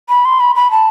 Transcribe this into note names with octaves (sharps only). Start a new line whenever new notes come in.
B5
C6
B5
B5
A5